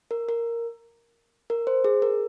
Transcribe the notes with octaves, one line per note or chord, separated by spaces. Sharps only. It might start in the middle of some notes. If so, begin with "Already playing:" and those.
A#4
A#4
A#4
C5
G#4
A#4